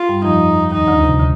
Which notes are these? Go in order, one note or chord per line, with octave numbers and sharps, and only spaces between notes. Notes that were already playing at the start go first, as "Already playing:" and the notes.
Already playing: F4
G2 G3
F2 F3 D#4
D#2 D#3 D#4
D2 D3
C3
D3